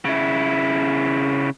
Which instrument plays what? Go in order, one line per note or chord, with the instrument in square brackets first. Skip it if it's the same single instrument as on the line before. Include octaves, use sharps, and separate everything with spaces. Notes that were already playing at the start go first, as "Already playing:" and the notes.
[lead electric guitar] C#3 E4